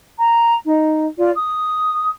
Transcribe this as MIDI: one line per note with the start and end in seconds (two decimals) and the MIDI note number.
0.19 0.55 82
0.65 1.06 63
1.19 1.30 65
1.19 1.30 74
1.35 2.09 87